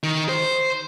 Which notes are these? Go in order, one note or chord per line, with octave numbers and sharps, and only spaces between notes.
D#3
C5